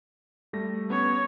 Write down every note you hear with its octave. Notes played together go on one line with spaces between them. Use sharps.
G3 A3 A#6
B3 C#4 C#5